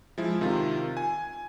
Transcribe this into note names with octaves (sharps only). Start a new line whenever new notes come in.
F3 G#3 E4
C3 D#3 F4
G#5